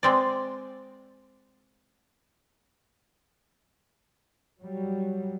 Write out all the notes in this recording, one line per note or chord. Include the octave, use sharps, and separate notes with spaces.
G#3 C4 D5
F#3 G3